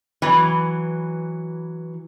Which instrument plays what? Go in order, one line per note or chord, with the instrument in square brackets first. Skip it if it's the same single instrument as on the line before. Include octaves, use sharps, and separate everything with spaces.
[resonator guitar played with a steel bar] E3 F#3